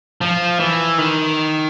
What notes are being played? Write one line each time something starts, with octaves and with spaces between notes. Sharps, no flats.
F3
E3
D#3